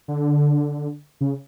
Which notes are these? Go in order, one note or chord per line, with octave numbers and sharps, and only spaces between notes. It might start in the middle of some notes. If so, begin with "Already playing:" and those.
D3
C#3